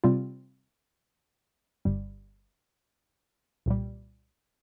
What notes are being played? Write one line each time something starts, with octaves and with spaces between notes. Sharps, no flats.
C3 G3 C4 F4
G1 G2 G3
C2 A#2 G3